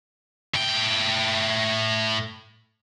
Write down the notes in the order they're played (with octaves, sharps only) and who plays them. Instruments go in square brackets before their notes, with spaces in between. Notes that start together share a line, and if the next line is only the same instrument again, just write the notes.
[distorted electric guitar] A2 G5